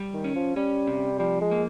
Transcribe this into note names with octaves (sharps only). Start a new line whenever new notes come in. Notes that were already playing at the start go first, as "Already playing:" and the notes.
Already playing: G3
D#3
C#4
F3
G3 C#4
C3
F3 G3
G#3
A#3